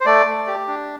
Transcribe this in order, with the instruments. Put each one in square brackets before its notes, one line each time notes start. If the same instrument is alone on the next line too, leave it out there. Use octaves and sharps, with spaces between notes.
[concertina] C5
A3 D5
A3
G4
D4